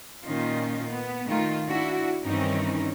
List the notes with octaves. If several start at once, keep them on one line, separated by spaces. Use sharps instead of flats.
A#2 D#3 C#4 D#4 F4
B3
D#3 A3 D#4 F4
D4 E4 F#4
G2 D#3 E3 C4 C#4 D#4